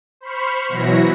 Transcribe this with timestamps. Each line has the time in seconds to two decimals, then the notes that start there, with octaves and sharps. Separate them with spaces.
0.21 C5 B5 C#6 F6
0.68 B2 E3 F#3 E4 F#4 A#6